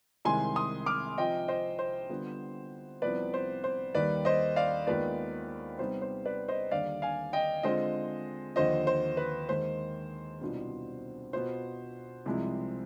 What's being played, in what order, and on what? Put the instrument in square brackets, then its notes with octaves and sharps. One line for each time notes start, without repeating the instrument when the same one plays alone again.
[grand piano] C2 C3 D#3 G#3 G#5 C6
C6 D#6
D6 F6
C3 F3 C4 F4 D#5 G5
C5 D#5
C5
D3 G3 B3 F4
C2 C3 F3 B3 B4 D5
C5
C5
D#2 D#3 G3 B4 D5
C5 D#5
D5 F5
D#2 D#3 G#3 B3 F4 B4 D5
C3 G3 B3 D#4 C5
C5
B4 D5
C5 D#5
D#2 D3 G3 D5 F5
F5 G#5
D#5 G5
D3 G#3 C4 F4 C5 D#5
D#2 D3 F3 C5 D#5
C5
B4
D#2 D#3 G#3 C5
C2 B2 B3 D4 F4
B2 B3 F4 C5
C2 C3 F3 G#3